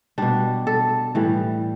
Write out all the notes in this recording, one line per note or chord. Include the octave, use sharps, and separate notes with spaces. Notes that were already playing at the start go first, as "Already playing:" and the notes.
B2 G3 D4
A4
A2 E3 G3